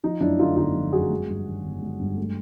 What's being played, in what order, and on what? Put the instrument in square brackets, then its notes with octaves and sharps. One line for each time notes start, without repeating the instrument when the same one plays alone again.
[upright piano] F3 D#4
F#2 D4 E4
D3 D#4 F4
G1 D#4 F4
F3
F#2 F#4 G#4
G#3
G2
D#3
G1
G#3
G2
A3